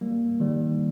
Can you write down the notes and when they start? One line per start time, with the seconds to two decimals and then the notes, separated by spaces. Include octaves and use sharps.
0.01 G3 A#3
0.40 D#3 G3